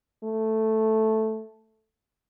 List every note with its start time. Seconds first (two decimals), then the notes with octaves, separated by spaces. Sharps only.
0.24 A3